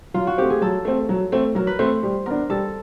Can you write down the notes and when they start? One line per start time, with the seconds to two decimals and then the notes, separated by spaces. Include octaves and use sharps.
0.14 F#3 F4
0.27 F#4
0.38 A3 C4 G4
0.50 G#4
0.62 F#3 A4
0.85 A3 C4
1.09 F#3
1.32 A3 C4
1.55 F#3 A#4
1.67 B4
1.79 A3 C4 C5
2.03 G3
2.26 B3 D4 A#4
2.50 G3 A4